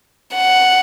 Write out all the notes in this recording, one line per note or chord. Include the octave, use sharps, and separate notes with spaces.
F#5